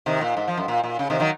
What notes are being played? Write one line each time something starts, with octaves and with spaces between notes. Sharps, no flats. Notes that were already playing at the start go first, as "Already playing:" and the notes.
C3 D#3
A#2
G#2
F3
F#2
A#2
A#2
C#3
C3 D#3
D#3 F#3